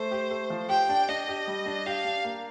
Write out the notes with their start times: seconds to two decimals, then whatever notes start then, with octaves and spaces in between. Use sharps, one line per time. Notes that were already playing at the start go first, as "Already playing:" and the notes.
Already playing: A3 C5
0.11 G4
0.31 A3
0.50 F3
0.69 G4 G5
0.89 D4
1.08 D4 D#5
1.28 G4
1.47 G3
1.66 D4
1.86 G4 F5
2.05 D4
2.24 A#3